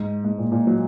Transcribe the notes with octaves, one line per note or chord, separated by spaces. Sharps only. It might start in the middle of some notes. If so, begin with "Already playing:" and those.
Already playing: G#2
G#2
A#2
A#2
F#3